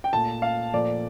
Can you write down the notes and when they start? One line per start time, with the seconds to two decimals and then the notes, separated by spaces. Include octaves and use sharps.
0.04 G5
0.12 A#2 A3 A5
0.42 F5
0.73 A#2 F3 A3 D5